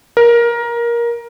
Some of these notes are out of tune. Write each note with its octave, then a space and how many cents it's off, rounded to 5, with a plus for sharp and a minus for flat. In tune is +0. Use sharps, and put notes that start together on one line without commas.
A#4 +15